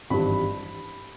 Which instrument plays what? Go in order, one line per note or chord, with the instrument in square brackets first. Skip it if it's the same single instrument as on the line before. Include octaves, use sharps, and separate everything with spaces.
[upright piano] G#1 G2 E3 G3 B5